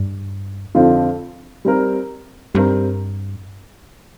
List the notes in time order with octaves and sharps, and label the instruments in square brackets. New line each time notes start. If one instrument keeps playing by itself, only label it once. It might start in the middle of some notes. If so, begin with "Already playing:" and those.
Already playing: [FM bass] G2
[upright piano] F2 D3 F3 C4 F4
G3 C4 A#4
[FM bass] G2 [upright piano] G3 C4 A#4